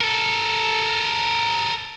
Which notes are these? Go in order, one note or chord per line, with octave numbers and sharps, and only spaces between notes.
A4 A#4